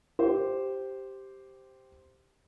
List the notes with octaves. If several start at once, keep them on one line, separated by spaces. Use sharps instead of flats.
G4 C5